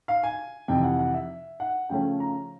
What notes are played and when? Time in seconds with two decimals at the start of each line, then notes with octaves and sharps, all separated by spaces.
0.08 F5
0.23 G#5
0.68 F2 C3 E3 G5
0.83 F#5
0.99 F#5
1.14 E5
1.60 F#5
1.89 C#3 F3 A3 C#4 G5
2.20 A#5